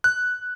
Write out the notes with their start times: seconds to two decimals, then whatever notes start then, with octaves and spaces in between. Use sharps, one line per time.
0.04 F#6